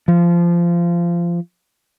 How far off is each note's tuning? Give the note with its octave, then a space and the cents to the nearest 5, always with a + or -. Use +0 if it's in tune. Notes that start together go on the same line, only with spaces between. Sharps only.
F3 -20